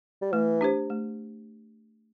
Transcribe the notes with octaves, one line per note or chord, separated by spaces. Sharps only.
G3
E3 A3
D4 G4 C5
A3